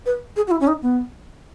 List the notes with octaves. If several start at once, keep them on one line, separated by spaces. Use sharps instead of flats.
B4
G#4
F#4
E4
C#4
D#4
B3